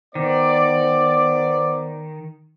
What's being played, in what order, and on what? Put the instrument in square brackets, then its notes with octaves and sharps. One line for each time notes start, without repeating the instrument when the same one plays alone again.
[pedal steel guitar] D#3 [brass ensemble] B3 C5 D5